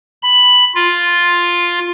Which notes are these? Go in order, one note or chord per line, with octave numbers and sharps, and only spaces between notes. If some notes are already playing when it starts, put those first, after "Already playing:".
B5
F4